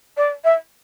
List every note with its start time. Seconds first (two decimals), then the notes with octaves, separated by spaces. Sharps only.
0.17 D5
0.44 E5